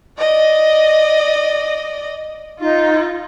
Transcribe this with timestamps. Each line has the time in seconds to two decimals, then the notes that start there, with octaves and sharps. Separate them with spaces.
0.18 D5 D#5
2.60 D#4 F4